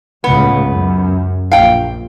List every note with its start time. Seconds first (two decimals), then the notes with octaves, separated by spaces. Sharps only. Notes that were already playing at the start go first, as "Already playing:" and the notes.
0.24 C#2 A2 C#3 B3
0.68 F#2
1.52 A#1 F5 G5